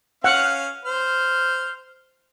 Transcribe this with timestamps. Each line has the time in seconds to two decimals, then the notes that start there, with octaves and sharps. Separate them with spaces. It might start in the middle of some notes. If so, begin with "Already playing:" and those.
0.24 C#4 F5 F#5 F6
0.85 C5 F6